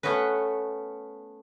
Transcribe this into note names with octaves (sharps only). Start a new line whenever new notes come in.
A3 B3 C#4 F#4 B4